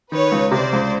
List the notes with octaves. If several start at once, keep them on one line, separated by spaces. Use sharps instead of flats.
D#3 B4 C#5
C#2
C3 C5 D5
C#2